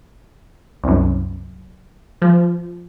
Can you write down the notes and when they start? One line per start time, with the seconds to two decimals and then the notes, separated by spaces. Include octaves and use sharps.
0.84 C2 F#2
2.22 F3